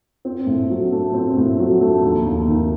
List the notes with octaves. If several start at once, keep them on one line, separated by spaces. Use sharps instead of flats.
C4
A2
F#3
A3
C4
A2
F#3
A3
D#2
D#2
D#3